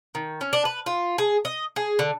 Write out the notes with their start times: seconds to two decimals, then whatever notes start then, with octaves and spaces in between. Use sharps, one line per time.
0.15 D#3
0.41 C#4
0.53 D4
0.65 B4
0.86 F4
1.18 G#4
1.45 D#5
1.76 G#4
1.99 D3